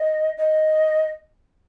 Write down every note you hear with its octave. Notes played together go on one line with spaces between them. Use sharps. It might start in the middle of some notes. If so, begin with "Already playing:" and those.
Already playing: D#5
D#5